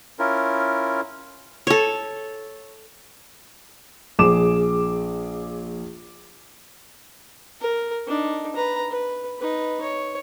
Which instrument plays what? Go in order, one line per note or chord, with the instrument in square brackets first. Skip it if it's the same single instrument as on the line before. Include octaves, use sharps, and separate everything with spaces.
[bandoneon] C#4 E4 F4 A#4
[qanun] A4 C#5
[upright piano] A#1 G#4 D6 E7
[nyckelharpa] A#4
D4 D#4
B4 A#5
B4
D#4 B4
C#5